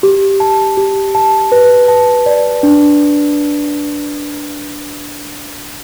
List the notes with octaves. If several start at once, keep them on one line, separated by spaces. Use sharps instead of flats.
G4
A5
G4
A5
B4
A5
D5
D4